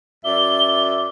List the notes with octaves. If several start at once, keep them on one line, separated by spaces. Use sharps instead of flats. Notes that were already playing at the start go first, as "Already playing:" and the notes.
F#2 D5 E5 G7